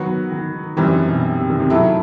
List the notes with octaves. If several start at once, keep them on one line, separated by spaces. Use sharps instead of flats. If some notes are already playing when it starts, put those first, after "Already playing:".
Already playing: D#3 F#3 B3 F#4
D#3
D#3
F#2 D#3 E3 G3 C4
B2
C3
D#3
C3
D#3 F#3 A3 E4